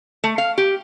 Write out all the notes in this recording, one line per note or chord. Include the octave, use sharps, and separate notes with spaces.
A3
F5
G4